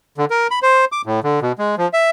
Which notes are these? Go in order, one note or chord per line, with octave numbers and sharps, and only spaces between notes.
D3
A#4
B5
C5
D6
A2
D3
B2
G#3
F3
E5